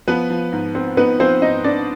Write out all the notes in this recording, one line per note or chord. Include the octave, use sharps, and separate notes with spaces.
F3 B3 B4
F3
G#2
C4
B3 D#4 B4
F3 C4 C5
G#2 D#4 D#5
C4 D4 D5